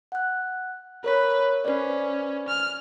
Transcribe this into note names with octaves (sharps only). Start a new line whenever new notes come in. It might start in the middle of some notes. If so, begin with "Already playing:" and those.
F#5 F#6
A#4 B4 C#5 B6
C#4 B4 C5 D5
F6